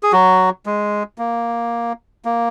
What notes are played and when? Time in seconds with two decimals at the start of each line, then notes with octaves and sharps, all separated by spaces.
0.03 G#4
0.12 F#3 F#4
0.66 G#3
1.18 A#3
2.25 A#3